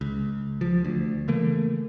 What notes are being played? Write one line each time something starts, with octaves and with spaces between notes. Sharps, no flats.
C#2
F3
D2
C#3 E3 A3 A#3